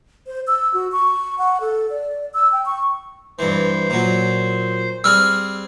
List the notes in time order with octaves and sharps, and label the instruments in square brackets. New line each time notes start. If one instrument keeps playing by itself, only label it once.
[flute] C5
E6
F#4
C#6
F#5
A4
D5
E6
G5
C#6
[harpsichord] G2 E3 [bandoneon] C5
[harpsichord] A#2 F#3
[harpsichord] G3 C4 G#4 [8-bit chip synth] E6 F6